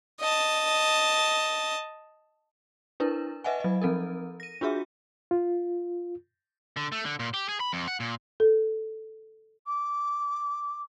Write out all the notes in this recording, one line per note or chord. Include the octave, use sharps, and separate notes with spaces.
D#5 A5
D4 E4 A#4 B4
B4 D#5 E5 F#5 G#5
F#3 D#5
F3 C4 A4 A#4
A#6 D#7
D4 F4 F#4 G#4 E5
F4
D3
A3
D3
A#2
G4
G#4
B5
F2
F#5
A#2
A4
D6